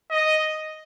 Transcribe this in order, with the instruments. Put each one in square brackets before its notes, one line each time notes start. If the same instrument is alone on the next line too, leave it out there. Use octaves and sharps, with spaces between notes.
[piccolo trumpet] D#5